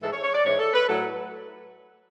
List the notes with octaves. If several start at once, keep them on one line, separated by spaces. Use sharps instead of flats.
G#2 E3 G#3 A4
C#5
C#5
D5
G#2 E3 G#3 C#5
A4
B4
A2 F#3 A4